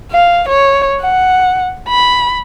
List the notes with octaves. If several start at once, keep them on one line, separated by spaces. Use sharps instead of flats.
F5
C#5
F#5
B5